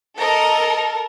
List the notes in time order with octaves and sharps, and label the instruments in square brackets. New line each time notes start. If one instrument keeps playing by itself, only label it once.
[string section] A4 A#4 [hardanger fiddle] D#5 A#5